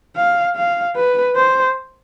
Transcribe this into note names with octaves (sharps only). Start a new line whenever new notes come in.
F5
F5
B4
C5